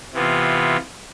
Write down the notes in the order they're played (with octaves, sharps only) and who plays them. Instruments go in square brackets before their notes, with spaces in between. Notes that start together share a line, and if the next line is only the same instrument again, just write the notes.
[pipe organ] C3 E3 B3 F4